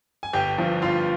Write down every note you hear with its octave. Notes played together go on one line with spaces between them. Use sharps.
G#5
G1 G4 G5
G2 F3
G1 F4 F5